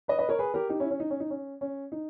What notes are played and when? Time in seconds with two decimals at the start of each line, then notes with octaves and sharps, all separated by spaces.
0.08 B4 D#5
0.19 B4 D#5
0.29 A#4 C#5
0.39 G#4 B4
0.54 G4 A#4
0.69 D#4 G4
0.79 C#4 E4
0.90 C#4
1.00 D#4
1.10 C#4
1.20 D#4
1.30 C#4
1.61 C#4
1.92 D#4